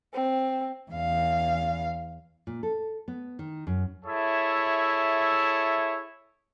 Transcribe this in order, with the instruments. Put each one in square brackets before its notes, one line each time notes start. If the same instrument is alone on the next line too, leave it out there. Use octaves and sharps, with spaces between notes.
[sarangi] C4
[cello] E2 F5
[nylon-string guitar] A#2
A4
B3
D#3
F#2
[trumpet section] E4 G#4 A4 C#5 E5